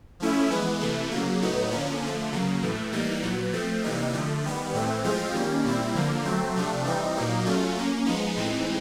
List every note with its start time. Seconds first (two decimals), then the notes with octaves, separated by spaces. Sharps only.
0.20 F3 A3 C#4 E4
0.51 E3 G#3 B3
0.80 C3 E3 A3
1.11 C#3 F#3 A#3
1.41 A2 F#3 B3 D#4
1.71 D3 F3 A#3 C#4
2.02 D3 F3 A3
2.32 C#3 F#3 A#3
2.62 A2 E3 A3
2.92 E3 G3 A#3 D#4
3.23 A#2 F#3 B3
3.53 F3 A3 C4
3.83 C3 E3 G3 A#3 D#4
4.13 D3 F3 A3
4.43 D#3 G3 B3
4.74 A2 E3 A3 C4
5.03 A2 F3 G#3 C4 F4
5.34 D#3 G3 A#3 C#4
5.64 A#2 G3 C4 E4
5.95 D3 F3 A#3
6.25 F#3 A3 C4
6.55 C3 F3 A3 D4
6.85 E3 G3 C4 D#4
7.15 A#2 F#3 A#3 D#4
7.45 F#3 A3 C#4 F4
7.75 F#3 A#3 C#4
8.06 F3 G#3 B3 D#4
8.36 A2 E3 G#3 C4 D#4